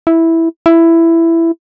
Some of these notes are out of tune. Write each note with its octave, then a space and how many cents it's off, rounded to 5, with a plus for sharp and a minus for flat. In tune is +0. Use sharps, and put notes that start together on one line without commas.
E4 -5
E4 +10